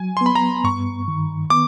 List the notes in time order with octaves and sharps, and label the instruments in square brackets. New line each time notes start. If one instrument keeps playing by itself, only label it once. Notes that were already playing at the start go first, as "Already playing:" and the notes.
Already playing: [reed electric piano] F#3 [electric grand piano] G#5
[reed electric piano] B3 [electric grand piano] C6
[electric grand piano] B5
A#5
[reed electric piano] G2 [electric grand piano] C#6
[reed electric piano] D#3
[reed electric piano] B3 [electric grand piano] D6